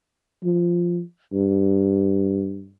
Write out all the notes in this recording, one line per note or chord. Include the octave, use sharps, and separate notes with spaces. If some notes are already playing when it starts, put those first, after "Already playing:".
F3
G2